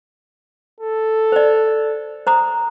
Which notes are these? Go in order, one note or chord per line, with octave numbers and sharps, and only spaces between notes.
A4
C5 D5
C5 A#5 D#6